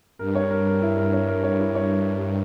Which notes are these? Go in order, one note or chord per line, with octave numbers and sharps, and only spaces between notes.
G2 A#4
C#5
A#4
A#4
E4
A#4
G2 C#5
A#4
C#5
E4
C#5